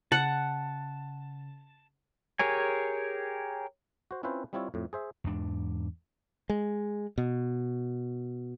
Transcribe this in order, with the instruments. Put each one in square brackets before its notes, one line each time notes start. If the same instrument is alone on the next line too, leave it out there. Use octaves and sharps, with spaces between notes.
[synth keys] C#3 [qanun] F#5 [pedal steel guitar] A5
[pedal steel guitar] G4 G#4 A#4 C#5 G#5
[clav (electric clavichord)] F#4 C5
C4 C#4 E4 F4 B4 C5
G3 C4 E4 F4 C#5
F2 A2
G#4 C5 E5
[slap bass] E2 G#2 D4
[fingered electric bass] G#3
B2